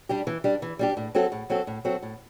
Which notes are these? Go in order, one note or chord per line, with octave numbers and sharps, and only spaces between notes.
G3 D4 G4
E3
G3 D4 G4
E3
G3 D4 G4
A2
F#3 C4 F#4 A4
A2
F#3 C4 F#4 A4
A2
F#3 C4 F#4 A4
A2